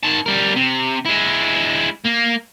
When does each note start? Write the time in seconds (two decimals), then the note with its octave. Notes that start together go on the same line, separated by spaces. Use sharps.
0.04 D#3 A5
0.26 G3 A#4
0.56 C3
1.05 G#3 E4
2.05 A#3